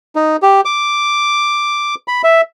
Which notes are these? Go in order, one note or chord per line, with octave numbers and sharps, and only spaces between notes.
D#4
G4
D6
B5
E5